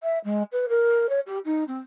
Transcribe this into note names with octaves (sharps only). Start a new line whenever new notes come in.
E5
G#3
B4
A#4
C#5
G4
D#4
C4